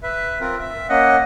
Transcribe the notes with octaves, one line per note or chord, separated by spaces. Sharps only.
B4 E5
C4 F4 A#4
E5
A#3 C#4 D#5 F#5